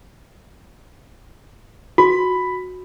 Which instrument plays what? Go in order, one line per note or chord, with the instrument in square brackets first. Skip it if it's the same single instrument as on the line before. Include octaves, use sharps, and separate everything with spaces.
[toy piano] F#4 [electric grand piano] B5